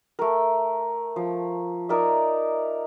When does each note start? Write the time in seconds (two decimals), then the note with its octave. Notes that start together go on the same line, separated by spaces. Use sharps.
0.19 A3 A#4
1.16 F3
1.89 D#4 A#4 D5 E5